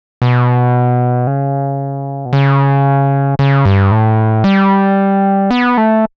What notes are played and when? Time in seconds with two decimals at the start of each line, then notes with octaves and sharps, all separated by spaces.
0.22 B2
1.27 C#3
2.26 B2
2.33 C#3
3.39 C#3
3.65 G2
3.92 A2
4.44 G3
5.51 B3
5.78 A3